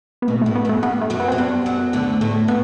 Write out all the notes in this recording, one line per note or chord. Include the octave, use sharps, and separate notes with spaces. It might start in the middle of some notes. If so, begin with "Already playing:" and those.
B3
B2 A3
A2 A3
B3
F#2 A3
G2 B3
A3
F#2 F#3
B3
C4
F#3
G2 G3 B3
F#2 F#3
D2 D3
A2 A3
A2 B3